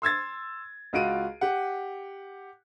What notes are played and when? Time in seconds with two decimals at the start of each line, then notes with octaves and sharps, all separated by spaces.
0.02 C6 E6 G#6 A6
0.93 C#2 F4 F#4 D7 D#7
1.41 G4 F#5